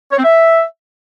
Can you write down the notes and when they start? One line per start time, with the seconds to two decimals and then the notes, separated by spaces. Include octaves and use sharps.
0.11 C#5
0.17 C4
0.24 E5